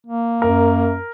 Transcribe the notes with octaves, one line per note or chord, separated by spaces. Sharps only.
A#3
F#2 A#4